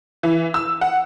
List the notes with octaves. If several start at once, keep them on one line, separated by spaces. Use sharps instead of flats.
E3
E6
F#5